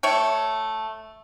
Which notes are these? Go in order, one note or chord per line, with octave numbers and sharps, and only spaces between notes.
A3 C#5 G5